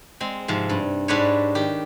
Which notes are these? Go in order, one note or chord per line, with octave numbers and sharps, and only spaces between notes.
G#3 C4
G#2 C3 F3
G2
G#2 D4 G4 B4 C#5
D#3 G4